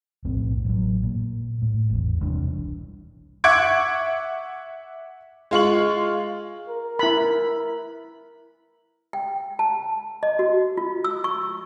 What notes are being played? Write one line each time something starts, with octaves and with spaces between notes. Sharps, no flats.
B1 F2 A2 C4
A1 F#3
A#2
A2
G#1 E2
E1 C2 E3 D4
E5 F#5 C#6 D6 G#6 D7
G#3 F4 C#6 F#7
A#4
E4 B5
G5
A5
D#5
F#4
F4
E6
C#6